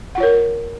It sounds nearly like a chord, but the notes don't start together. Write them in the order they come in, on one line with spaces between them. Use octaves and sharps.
F#5 F4 C#5 A#4